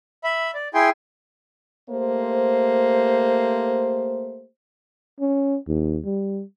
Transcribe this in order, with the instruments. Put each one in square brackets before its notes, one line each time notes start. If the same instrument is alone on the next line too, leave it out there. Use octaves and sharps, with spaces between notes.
[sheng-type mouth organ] E5 B5
D5
E4 G#4 G5 G#5 C6
[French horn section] A3 A#3 G4 C5
[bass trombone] C#4
D#2
G3